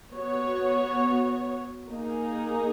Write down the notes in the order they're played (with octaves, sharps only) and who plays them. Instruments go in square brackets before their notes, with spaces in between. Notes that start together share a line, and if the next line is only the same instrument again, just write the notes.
[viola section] B3 F#4 C#5
A#3 D#4 G#4